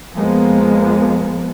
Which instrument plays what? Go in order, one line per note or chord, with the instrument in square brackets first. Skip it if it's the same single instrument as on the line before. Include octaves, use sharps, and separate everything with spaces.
[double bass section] F2 F3 G#3 A#3 B3